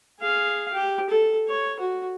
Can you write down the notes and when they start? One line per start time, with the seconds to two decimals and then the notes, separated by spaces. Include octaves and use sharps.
0.20 G#4 F5
0.73 G4
1.10 A4
1.48 C#5
1.80 F#4